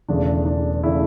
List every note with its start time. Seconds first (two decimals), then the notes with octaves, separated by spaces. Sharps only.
0.08 E1 E2 C#3 E3 A3 D4
0.46 D4
0.83 C#3 E3 A3 E4